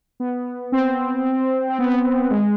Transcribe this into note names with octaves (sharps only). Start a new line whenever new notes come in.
B3
C4
C4
B3
G#3